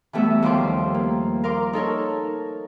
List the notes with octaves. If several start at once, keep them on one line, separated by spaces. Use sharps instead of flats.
E3 G3 A3 B3 F#4 E5
D#2 F3 G3 F#4 C6 D6
A#3
A#4 F5 C6 D6
D#4 A4 A#4 C#5